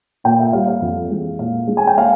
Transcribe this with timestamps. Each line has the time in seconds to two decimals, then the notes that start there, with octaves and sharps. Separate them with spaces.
0.24 A#2 G5
0.39 E5
0.53 G3 F5
0.67 F5
0.82 F2
1.10 E3 G#3
1.39 A#2 F5
1.67 G#3
1.77 G#5
1.87 G5
1.98 F5